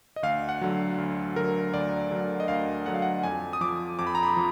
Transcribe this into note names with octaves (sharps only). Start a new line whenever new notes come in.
D#5
D2 F5
F#5
D3 F#3
D2
D3 F#3 A#4
D2 D5
D3 F#3
D#5
D2 F5
D3 F#3 F#5
F5
F#5
F2 G#5
D#6
F3 D6
F2 D6
B5
A#5
B5
F3